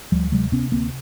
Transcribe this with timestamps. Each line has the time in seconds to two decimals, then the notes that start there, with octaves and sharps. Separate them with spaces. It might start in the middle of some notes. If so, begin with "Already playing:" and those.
0.12 D2 F3 G3
0.32 C3 F#3 G#3
0.52 C3 B3 C#4
0.72 D2 A#3 C4